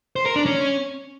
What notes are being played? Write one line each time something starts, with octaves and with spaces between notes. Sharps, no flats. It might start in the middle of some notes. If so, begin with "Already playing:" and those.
C5
A#4
D4
C#4